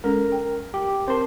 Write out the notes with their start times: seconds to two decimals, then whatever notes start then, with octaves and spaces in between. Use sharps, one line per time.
0.04 G#3 C#4 A4 A#4
0.32 G5
0.74 G4
1.08 C4 A#4 C5 A5 C6